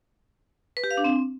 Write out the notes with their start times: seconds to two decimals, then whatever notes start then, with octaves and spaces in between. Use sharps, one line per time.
0.77 B4
0.84 G4
0.91 F5
0.97 D4
1.04 C4